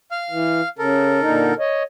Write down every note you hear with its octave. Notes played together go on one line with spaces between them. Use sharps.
F5 F6
E3
C#3 A4 A#4
A#2 D3 D#4
C#5 D#5